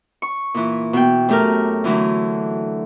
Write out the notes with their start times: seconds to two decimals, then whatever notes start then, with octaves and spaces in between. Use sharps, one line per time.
0.22 C#6
0.54 A#2 E3
0.93 B2 G5
1.28 F#2 A3 G4 A#4 F6
1.84 D3 E3 F#3 A3